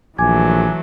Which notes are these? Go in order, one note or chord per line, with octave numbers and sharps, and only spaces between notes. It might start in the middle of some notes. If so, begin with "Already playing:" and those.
A#1 E3 F#3 A3 G#5 D6 G#6